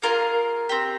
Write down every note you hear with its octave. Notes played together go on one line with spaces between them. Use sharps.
A#3 F4 G#4 A#4
C4 G4